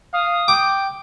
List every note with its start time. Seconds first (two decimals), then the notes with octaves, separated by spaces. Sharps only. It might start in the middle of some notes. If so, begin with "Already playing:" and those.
0.14 F5 D#6
0.48 G5 D6